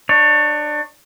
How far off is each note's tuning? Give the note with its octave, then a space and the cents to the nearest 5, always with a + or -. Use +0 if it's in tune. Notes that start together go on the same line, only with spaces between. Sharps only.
D4 +25 C#5 +0